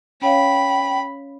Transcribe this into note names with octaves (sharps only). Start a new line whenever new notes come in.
C#4 C#5 F5 G5 B5